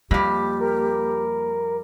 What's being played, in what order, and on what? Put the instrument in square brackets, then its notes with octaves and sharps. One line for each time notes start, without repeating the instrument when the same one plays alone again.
[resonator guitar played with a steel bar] F2 G3 [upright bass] A#3 [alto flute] G4
[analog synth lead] A#4